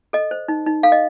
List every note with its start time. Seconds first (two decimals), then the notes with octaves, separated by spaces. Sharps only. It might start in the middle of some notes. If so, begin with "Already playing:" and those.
0.13 A4 D#5
0.31 C5
0.48 D#4
0.66 D#4
0.83 A4 F5
0.92 D#5